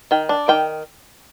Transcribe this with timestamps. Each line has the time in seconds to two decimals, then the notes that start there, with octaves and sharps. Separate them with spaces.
0.11 D#3 G5
0.29 D4
0.48 D#3 G5